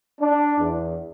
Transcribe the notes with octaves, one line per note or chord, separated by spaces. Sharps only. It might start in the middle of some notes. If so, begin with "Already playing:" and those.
D4
E2